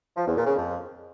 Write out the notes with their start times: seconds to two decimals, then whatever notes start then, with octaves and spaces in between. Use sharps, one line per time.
0.16 F3
0.26 E2
0.36 A#2
0.46 C#3
0.56 F2